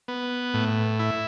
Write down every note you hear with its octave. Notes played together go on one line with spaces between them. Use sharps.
B3
A2
E4